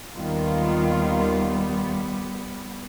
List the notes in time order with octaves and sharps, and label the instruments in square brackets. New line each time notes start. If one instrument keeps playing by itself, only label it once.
[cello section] D#2 D#3 F4 [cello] G3 B3